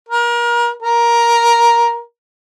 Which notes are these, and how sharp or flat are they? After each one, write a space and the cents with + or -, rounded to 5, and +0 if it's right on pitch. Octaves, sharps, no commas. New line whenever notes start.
A#4 +30
A#4 +10